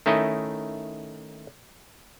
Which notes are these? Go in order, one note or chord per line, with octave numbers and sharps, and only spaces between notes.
D#3 A3 C#4 D#4 E4 D#5